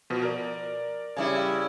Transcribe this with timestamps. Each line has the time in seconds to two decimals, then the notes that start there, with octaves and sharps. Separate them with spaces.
0.10 B2 F3
0.23 A#4 D5
1.16 C#3 G3 E4